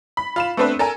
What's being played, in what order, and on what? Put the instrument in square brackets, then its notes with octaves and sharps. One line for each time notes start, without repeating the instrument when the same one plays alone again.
[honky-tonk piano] B5
F4 B5 E7
A3 B3 C4 D4 B4
A4 A#4 G#5